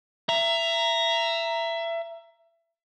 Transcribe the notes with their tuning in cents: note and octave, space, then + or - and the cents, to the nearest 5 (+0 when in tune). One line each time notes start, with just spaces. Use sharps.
E5 +20 A#5 +0